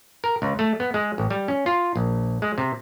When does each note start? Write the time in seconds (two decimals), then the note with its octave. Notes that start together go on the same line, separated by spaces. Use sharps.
0.24 A#4
0.42 C#2
0.59 A3
0.80 B3
0.94 G#3
1.18 A1
1.30 G3
1.48 C#4
1.66 F4
1.96 A#1
2.42 G#3
2.58 C3